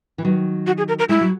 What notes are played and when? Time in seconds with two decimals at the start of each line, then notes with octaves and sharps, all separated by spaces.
0.18 E3
0.25 D#3 F#3
0.67 F#4
0.78 G#4
0.88 A#4
0.99 A#4
1.09 G#3 E4
1.21 F#3